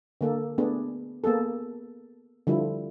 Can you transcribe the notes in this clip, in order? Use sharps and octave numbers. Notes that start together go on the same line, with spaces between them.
D3 A#3 A4
A3 B3 D4 G#4
A#3 B3 G#4 A4
D3 F3 G3 E4